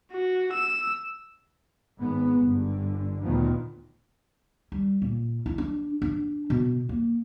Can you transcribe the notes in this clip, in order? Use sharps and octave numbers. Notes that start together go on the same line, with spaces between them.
F#4
E6
G#1 G#2 B3
G1 D3
D2 A#2 D#3 F3 B3
G3
A#2
E4
D4
D4
B2
A#3